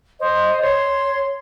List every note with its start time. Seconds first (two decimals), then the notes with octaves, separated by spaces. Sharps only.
0.19 C5 D#5
0.60 C#5 C6